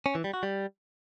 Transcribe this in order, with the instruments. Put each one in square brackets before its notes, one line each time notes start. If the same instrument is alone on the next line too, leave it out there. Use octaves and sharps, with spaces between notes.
[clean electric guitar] C#4
E3
G3
F#4
G3